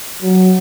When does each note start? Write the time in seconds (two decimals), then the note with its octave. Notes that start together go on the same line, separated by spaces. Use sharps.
0.23 F#3